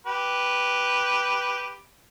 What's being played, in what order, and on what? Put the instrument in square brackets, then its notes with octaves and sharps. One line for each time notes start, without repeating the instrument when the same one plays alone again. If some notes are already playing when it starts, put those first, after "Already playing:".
[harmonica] G4 B4